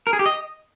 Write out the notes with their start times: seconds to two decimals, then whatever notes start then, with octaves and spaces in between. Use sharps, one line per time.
0.07 A#4
0.13 G#4
0.19 G4
0.26 D#5